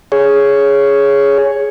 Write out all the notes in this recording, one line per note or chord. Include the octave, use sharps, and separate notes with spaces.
G#4 C#5